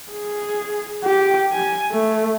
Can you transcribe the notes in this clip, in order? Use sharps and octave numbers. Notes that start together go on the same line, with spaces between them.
G#4
G4
G#5
A3